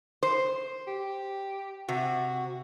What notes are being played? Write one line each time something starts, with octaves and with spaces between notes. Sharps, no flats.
C5
G4
C3 F#4